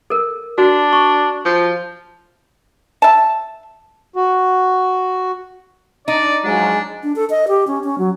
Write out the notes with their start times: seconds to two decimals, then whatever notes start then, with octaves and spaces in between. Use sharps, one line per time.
0.10 A4 A#4
0.58 D4 F#4
0.93 C#6
1.45 F3
3.02 E5 A5
4.16 F#4
6.08 D4 D#4 D5 D#5
6.44 F3 F#3 G#3 D4
7.03 D4
7.16 A4
7.30 D#5
7.48 G4
7.67 C#4
7.84 C#4
7.98 F#3